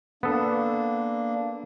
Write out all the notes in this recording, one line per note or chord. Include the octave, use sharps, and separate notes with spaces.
A#3 B3 D4 A4